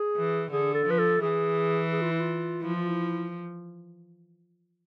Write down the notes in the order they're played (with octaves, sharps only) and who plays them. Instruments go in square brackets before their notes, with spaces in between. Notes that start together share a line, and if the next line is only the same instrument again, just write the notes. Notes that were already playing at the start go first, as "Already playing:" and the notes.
Already playing: [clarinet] G#4
[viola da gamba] E3
[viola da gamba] D3 [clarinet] G#4
[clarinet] A4
[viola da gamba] F3 [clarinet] B4
[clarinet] A4
[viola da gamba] E3 [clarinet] G#4
[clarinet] G#4
F4
E4
F4
[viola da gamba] F3 [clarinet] E4
[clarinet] F4
E4